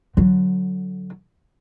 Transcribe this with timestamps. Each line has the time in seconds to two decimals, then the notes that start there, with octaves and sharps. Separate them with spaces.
0.17 D3 F#3